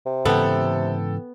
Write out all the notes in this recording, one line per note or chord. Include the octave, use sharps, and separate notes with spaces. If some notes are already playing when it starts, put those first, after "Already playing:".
C3
G#2 C#3 E3 B3 A4 G5